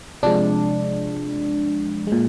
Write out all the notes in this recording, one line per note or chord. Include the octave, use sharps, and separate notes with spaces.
C3 F3 G#3 D4
A#2 G#3